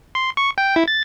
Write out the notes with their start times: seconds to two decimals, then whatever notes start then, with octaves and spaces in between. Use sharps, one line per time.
0.15 C6
0.37 C#6
0.58 G5
0.76 E4
0.88 A6